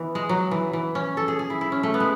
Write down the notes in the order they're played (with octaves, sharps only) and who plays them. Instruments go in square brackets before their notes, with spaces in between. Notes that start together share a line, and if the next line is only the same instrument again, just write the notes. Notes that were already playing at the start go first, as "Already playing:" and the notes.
Already playing: [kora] E3 B3
G#3
F#3
E3
E3
C#4
A4
G#4
G#4
E4
E4
C#4
A3
B3
G#3